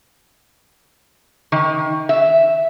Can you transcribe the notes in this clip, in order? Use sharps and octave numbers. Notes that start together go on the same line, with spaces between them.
D#3
E5